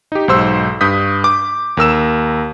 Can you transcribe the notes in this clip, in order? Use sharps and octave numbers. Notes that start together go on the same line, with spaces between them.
D#4 G4
B1 G#2 C5 E6
G2 D#6 G6 B6
D6
D#2 A#4 E6 E7